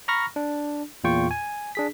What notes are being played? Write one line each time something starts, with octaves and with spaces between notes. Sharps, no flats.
A#5 B5 C#6 F6 A#6
D4
E2 A#2 F4 G5 C#6
G#5
D4 G#4 B6